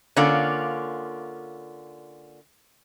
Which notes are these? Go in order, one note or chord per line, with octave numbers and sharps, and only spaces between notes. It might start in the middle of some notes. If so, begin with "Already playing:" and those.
D3 A#3 C#4 F4 D5